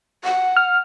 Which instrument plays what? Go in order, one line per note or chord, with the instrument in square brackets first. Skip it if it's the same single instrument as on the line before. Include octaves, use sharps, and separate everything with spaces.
[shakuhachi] F#5
[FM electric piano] F6